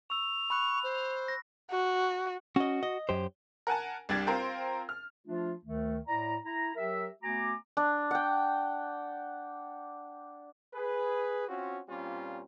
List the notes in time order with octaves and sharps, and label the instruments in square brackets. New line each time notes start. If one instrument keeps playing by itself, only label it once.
[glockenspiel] C#6 E6 [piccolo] F7
[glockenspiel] B5 F#6 [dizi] C#6
[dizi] C5
[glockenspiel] A#6
[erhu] F#4
[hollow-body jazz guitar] C#4 D#5 [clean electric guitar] F#4
[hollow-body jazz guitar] D#5
[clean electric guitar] F#2 G4 C5
[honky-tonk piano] A#4 F#5 G#5 A5
C2 G3 D4 G4 G#6 A6
C4 F4 A#4 C5 G5
F6
[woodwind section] F3 A3 D4 F4
D2 D#3 A3
A2 E4 D5 A#5
E4 A#5
F#3 G4 A#4 E5
A3 B3 F#4 G#5 A#5 D6
[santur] D4
F#5 G5
[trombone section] G#4 B4
C4 C#4 F4 F#4
A#2 G3 C4 C#4 F4